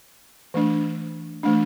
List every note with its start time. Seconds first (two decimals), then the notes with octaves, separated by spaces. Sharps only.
0.54 E3 A3 D4
1.43 E3 A3 D4